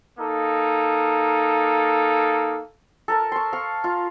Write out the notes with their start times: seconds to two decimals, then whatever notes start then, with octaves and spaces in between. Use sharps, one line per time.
0.19 A#3 D#4 A4
3.08 A4 A#4 A5
3.32 C6 C#6
3.53 F5 C#6
3.84 F4